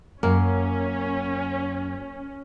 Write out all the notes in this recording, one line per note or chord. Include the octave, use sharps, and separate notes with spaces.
F#2 A#3 C#4